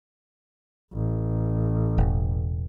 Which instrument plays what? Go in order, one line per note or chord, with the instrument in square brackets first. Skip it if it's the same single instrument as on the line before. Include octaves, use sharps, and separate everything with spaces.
[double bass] A1
[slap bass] E1